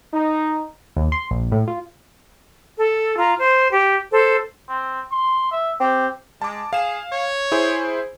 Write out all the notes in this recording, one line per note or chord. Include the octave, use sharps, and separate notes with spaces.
D#4
D#2
C6
A#1
A2
F4
A4
F4 A#5
C5
G4
A4 C5
C4
C6
E5
C4 G4
G#3 A5 D6
G#4 F5 E7
C#5
E4 G#4 C5